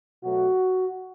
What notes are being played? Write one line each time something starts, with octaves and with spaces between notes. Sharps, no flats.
B2 F#3 A3 F#4